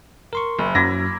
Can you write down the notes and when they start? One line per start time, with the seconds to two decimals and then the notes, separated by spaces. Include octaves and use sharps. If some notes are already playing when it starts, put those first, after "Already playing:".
0.33 A#4 C6 C#6
0.59 F#1
0.75 F#2 F#3 A#3 E4 A#6